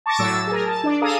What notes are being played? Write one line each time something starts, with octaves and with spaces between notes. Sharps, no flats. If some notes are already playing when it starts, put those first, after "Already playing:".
A5 C#6 D6 A6 A#6
A2 F#3 E6 A6
G#4 A#4
A5
D4 D5
G#4 A4 F5 A#5 D#6